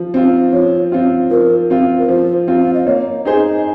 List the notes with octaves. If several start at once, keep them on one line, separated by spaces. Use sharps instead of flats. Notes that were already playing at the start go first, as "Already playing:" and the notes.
Already playing: F3
C4 F4
F3 C#5
C4 F4
F3 A#4
C4 F4
A#4
F3 C5
C4 F4
F5
D#5
A#3 C#5
D#4 G#4 C5 D#5